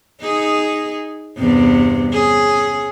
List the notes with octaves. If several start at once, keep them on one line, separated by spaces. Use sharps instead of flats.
D#4 G#4
E2 G2 C3
C#4 G#4